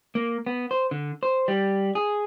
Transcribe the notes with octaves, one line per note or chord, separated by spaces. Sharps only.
A#3
B3
C5
D3
C5
G3
G#4